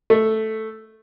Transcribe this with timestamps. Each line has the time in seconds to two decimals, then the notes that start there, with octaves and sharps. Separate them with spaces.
0.10 A3